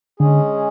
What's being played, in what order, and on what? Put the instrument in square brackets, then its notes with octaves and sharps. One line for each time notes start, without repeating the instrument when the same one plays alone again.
[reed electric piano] D3 [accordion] G#3 C#4 G#4